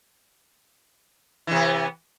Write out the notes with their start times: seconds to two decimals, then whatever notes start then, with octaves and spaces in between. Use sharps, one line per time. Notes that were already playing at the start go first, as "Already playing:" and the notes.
1.47 E3
1.51 C3
1.55 B3